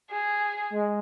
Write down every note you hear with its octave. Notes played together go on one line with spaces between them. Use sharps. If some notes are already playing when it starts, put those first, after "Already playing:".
G#4
G#3